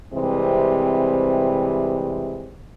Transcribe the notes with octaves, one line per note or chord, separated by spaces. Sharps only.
C3 E3 G3 G#3 C4